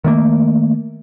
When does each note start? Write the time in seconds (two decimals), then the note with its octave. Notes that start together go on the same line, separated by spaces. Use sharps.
0.04 D#3 A3 A#3